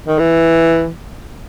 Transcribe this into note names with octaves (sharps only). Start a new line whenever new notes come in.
D#3
E3